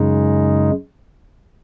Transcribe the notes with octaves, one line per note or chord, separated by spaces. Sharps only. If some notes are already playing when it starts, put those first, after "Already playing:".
Already playing: F#2 C#3 G#3 D#4